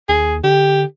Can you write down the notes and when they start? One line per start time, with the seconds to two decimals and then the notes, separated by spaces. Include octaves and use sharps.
0.09 D#2 G#4
0.44 D3 G4